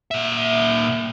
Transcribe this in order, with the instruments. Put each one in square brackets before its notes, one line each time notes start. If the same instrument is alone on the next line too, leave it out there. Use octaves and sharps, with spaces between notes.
[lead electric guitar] A#2 E5